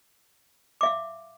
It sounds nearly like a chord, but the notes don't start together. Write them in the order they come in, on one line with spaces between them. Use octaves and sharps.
D6 E5 F5